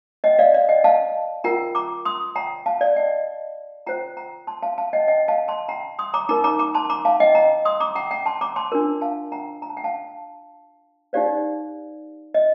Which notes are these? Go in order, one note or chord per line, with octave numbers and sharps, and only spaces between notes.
D#5 G5
D5 F5
D5 F5
D#5 G5
F5 A5
F4 A#4 G5 A#5
A#5 D6
C6 D#6
G5 A#5
F5 A5
D5 F5
D#5 G5
F4 C5 G5 A#5
G5 A#5
A5 C6
F5 A5
F5 A5
D#5 G5
D#5 G5
F5 A5
A5 C6
G5 A#5
C6 D#6
A#5 D6
D#4 A#4 A#5 D6
A#5 D6
A#5 D6
A5 C6
A#5 D6
F5 A5
D#5 G5
G5 A#5
C6 D#6
A#5 D6
G5 A#5
G5 A#5
A5 C6
A#5 D6
A5 C6
D4 F4 A#4
F5 A5
G5 A#5
A#5
A5
G5
F5 A5
D#4 G4 C5 D5 F5
D#5